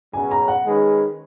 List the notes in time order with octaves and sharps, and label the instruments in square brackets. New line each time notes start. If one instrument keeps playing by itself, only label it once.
[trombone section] B2 F#3 C#4 G#4 B4 [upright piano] G#5
[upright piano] A#5
F#5
[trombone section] D#3 G#3 C#4 G#4 B4